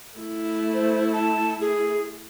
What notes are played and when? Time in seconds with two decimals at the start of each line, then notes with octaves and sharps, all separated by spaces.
0.19 A3 E4
0.74 C5
1.13 A5
1.61 G#4